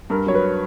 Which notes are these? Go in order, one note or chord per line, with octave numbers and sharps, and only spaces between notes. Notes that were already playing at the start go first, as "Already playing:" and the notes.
G2 A#4
F#3 C#5
B4